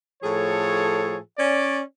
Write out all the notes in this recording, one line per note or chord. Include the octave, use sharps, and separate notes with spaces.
A2 F3 G#4 A4 C#5
C#4 D5